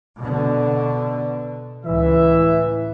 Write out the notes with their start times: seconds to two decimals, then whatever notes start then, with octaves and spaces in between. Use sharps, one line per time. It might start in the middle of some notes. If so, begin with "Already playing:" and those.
0.20 B2 D3
1.85 C#2 A2 E3 E5